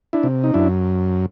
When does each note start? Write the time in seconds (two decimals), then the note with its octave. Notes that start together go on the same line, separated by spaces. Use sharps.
0.13 D4 E4
0.23 C3
0.44 D#4
0.54 F#2 D4 E4